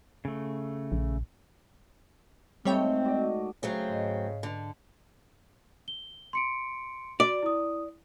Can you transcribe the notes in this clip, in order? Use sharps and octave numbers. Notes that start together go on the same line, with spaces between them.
C#3 A3
A#1
G#2 G3 A3 C4 C#5 G5
F#4 D5 D#5
C#3 F#3 A3 C4
G#2 D#5
D3
G7
C6 C#7 D7
F#4 D5
E4 D#6